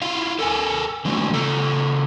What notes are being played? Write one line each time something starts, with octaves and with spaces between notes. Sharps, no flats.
E4 F4 F5
A4 A#4 G#5
D3 E3 F#3 G#3 A3
C#3 F4 A4